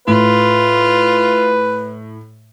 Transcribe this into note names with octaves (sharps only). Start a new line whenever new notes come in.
A2 F4 B4